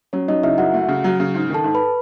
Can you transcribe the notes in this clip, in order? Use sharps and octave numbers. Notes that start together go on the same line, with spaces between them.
F#3 C#4 C#5
F#3 D#4 D#5
C#3 E4 E5
F#2 F#4 F#5
A3
C#3
F#3
C#3
G#2
D#3 A4 A5
G#2
B4 B5